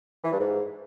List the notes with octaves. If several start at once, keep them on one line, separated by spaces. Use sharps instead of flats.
E3
G2
G#2